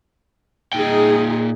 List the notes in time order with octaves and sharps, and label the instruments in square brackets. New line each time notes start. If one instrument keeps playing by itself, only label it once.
[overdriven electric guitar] A#2 G5 [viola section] D#4 G#4